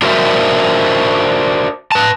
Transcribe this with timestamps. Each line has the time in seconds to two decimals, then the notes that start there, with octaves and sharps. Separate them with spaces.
0.02 D4 F#4 A#4 C5 D#5 E5
1.92 B4 A5